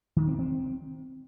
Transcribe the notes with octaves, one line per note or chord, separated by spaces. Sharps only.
D#3
C4
C4